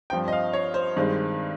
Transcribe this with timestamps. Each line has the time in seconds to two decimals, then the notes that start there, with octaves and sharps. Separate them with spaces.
0.10 G2 F3 C4 G5
0.28 D#5
0.33 F5
0.53 C#5
0.74 C5
0.97 G2 D#3 G#3 C4